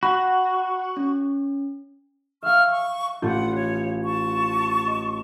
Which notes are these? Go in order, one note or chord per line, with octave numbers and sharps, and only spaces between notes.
F#4 F#5 B5
C#4
E5 F5 C#6 F6
C#6
A1 F4 F#5 G6
C#5
A5 C#6
D#5